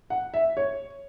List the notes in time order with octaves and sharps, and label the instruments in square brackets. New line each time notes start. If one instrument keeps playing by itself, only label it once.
[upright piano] F#5
E5
C#5